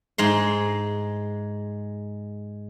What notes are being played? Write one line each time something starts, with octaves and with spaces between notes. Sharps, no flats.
G#2 G#3 C6